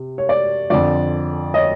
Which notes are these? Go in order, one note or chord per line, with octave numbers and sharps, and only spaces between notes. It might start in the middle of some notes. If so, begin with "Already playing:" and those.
Already playing: C3
C#5
D5
F2 D3 F3 D5
C#5 D#5